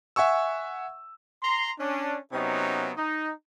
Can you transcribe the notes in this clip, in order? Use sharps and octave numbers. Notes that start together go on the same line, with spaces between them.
E5 F#5 G#5 C#6 E6
A#5 C6
C#4 D4
C3 F#3 B3 C#4 D#4
D#4